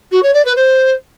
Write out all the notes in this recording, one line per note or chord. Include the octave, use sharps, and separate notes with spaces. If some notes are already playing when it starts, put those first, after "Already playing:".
F#4
C#5
D5
B4
C5